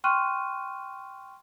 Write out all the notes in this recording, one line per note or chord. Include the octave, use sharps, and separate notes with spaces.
G5 C6 C#6 F6 F#6 D#7